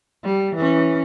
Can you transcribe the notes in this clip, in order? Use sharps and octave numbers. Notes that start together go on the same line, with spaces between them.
G3
E3 C#4